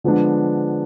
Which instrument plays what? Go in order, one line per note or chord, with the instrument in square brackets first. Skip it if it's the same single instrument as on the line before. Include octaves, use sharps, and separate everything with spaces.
[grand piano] D3 F3 G#3 B3 D4